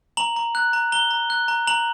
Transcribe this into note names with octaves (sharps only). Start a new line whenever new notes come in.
A#5 F#7
A#5
F#6
A#5
A#5 G7
A#5
F#6
A#5
A#5 F#7